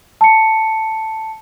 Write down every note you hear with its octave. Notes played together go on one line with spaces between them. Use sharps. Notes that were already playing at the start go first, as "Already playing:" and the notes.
A5 C#7